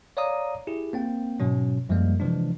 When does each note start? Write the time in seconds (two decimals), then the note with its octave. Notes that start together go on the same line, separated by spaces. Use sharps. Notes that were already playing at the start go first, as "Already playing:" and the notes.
0.17 C#5 D5 F5 A#5 D#6
0.67 E4 G4 G#4
0.93 A#3 C4 G5
1.40 G#2 B2 F#3 C#4
1.89 F#2 F3 G3 G#3 A#3
2.20 C3 E3 F3 G#3 D4